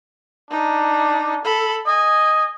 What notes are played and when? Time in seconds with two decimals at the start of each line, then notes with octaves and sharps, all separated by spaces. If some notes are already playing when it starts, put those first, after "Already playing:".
0.51 D4 D#4
1.45 A4 B5
1.86 D#5 G#5